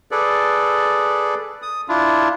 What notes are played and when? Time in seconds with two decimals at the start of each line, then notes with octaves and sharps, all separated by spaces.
0.11 G#4 A4 B4 D5
1.62 D#6
1.89 D4 E4 F4